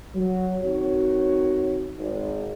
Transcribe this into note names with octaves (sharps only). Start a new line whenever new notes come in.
F#3
D#3 C4 F#4 C#5
G#1